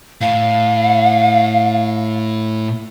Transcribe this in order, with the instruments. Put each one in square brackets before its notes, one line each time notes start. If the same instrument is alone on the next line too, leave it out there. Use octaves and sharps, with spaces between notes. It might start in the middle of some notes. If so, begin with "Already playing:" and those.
[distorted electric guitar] A2 [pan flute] F5